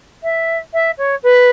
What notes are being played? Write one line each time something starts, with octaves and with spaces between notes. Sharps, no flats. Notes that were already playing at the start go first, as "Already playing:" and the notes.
E5
E5
C#5
B4